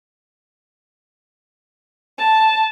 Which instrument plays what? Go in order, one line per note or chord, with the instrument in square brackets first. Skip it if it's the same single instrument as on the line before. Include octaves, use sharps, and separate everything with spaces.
[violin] A5